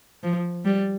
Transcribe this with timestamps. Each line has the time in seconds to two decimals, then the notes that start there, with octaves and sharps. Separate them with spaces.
0.23 F3
0.65 G3